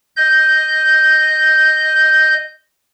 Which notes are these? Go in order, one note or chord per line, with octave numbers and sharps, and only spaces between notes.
D#5 G6